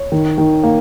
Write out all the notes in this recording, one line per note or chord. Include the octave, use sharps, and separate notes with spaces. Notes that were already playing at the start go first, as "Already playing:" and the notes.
Already playing: C#5
D#3
D#3
A#3